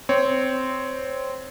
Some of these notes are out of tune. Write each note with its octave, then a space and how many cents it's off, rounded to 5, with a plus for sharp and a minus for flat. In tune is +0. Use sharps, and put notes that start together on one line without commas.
C4 -10 C#5 +5